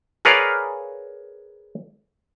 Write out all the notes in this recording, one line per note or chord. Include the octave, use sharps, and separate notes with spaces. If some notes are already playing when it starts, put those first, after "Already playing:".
G#4 A#4 B4 C#5 D5 F5